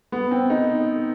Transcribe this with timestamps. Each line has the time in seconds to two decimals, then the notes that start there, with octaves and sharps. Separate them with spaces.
0.12 B3
0.31 C4
0.50 D#4